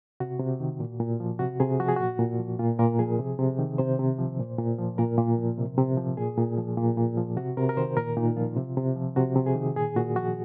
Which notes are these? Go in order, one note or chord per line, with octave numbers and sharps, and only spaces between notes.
C3 F#4
C3
D#3
A#2
A#2
F3
C3 F#4
C3 G#4
F3 F#4
G#4
A#2 F#4
A#2
F3
A#2 F4
A#2 A#4
F3 G#4
C3
C3
D#3
C3 C5
C3
F3
A#2
A#2
F3
A#2 A#4
A#2
F3
C3
C3
F3
A#2 G#4
A#2
F3
A#2
A#2
F3
C3 F#4
C3 A#4
A#4
D#3 C5
A#2 A#4
A#2 D#4
F3 F4
C3
C3
F3
C3 F#4
C3
G#4
D#3
A#2 G#4
A#2 F#4
F3 F#4